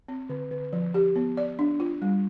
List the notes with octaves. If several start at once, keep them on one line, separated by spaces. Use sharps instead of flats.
C4
D3
D3
F3
G4
B3
D5
D4
F4
G3